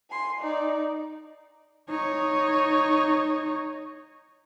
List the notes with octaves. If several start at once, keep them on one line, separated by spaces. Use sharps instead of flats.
G#5 C6
D#4 D5
D#4 C#5